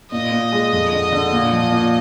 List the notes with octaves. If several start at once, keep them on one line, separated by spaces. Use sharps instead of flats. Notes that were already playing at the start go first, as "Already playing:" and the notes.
A#2 D#5
A#2
G#3
F2
D3
D3
A#2
F3
A#2